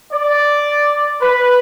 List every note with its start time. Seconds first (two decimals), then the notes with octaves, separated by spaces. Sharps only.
0.13 D5
1.22 B4